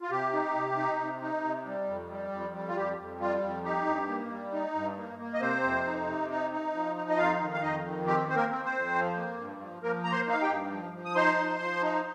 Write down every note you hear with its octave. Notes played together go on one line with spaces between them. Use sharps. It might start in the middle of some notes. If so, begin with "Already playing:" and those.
F4
C3 G4
D#4
C3
D#4
C3
D#4
C3
G3
F2
G3
F2
G3
F4
F2 G4
F2
G3 F4
F2
D#4 G4
G2
A#3
G3
D#4
G2
A#3
A#3
D#5
C3 C4 C5
F2
D#4
C3
D#4
D#4
F3
D#4
D#5
F2 F4 F5
D#3
F5
F2 D#4 D#5
D#3
C4 G4
C4 C5
A#3 A#4
C4
C4 C5
F2
F3
A#3
G2
F3
F3 A#3 A#4
A#3 A#5
C5 C6
D#4 F5
G4 G5
G2
F3
F3
D#6
D#4 C5 C6
F3
F3
D#4